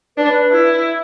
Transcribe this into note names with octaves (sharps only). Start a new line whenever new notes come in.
D4 B4
E4